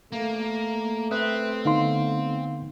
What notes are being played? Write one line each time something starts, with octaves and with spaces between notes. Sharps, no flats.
A3 A#3
C4 B4 E5 D#6
D3 B3 D#4 F5 C6